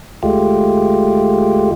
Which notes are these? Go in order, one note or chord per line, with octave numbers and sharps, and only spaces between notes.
D2 G#3 A3 F4 G4